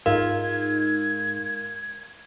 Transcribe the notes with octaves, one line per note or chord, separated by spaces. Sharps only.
G#2 G#3 D#4 F4 A#4 G#6